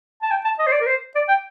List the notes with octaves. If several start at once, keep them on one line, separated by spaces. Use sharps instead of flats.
A5
G5
A5
D#5
C5
D5
A#4
C5
D5
G5